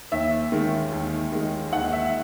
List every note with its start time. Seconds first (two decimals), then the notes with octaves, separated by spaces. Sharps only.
0.12 D#2 E5
0.52 D#3 G#3
0.92 D#2
1.32 D#3 G#3
1.72 D#2 F#5
1.93 E5